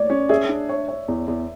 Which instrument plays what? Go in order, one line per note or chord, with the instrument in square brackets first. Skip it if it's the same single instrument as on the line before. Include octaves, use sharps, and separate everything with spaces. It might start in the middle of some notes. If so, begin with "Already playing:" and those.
Already playing: [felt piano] C#5 D5
[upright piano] C#4
[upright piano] G#4 [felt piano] E5
[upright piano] D4
C#5
C#5
E2
E2